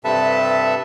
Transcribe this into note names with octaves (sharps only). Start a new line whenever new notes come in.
G2 C3 A4 B4 E5 A5